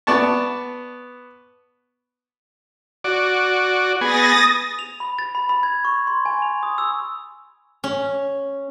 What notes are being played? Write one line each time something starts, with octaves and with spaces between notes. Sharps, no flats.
B3 D5 A5 C#6
F#4 D5
B3 G#4 D#6 A6 A#6
F7
B5
A6
B5
B5
G#6
C#6
C6
G#5
F7
D#6
E6
C#4